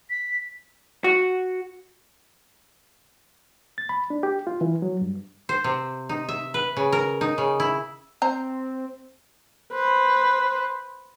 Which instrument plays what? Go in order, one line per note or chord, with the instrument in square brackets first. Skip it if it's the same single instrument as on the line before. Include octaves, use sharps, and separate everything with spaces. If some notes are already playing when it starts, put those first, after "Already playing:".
[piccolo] B6
[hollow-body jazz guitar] F#4
[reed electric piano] A6
B5
D4
G4
F4
E3
F#3
G2
[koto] C5
C3
D#4
E5
B4
C#3
A#4
D#4
C#3
E4
[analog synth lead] C4 [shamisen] C5 A#5
[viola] B4 C5